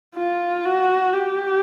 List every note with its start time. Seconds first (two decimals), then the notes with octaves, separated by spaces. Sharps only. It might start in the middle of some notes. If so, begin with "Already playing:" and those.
0.16 F4
0.65 F#4
1.13 G4